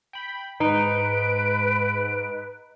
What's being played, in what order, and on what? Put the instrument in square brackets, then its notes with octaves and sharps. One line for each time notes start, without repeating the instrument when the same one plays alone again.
[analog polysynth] G5 B5
[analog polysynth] G#2 [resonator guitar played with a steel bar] D#4 [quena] B4 [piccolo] D7